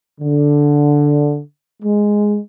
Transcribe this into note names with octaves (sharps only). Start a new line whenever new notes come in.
D3
G#3